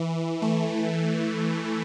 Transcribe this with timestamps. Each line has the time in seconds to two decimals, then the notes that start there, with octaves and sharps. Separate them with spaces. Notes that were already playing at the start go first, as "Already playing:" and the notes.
Already playing: E3
0.42 A3